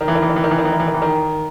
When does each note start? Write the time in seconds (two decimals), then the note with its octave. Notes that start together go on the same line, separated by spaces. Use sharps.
0.01 D#3
0.08 E3
0.15 D#3
0.22 E3
0.29 D#3
0.36 E3
0.44 D#3
0.51 E3
0.58 D#3
0.65 E3
0.72 D#3
0.80 E3
0.88 D#3
0.94 E3
1.02 D#3